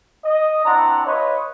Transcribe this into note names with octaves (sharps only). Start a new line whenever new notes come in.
D#5
C4 D4 E4 D5 F#5 A#5
F4 B4 C#5 D#5